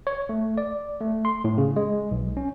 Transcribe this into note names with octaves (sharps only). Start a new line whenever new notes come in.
C#5
A3
D5
A3
C6
A2
C#3
G#3
B1
C#4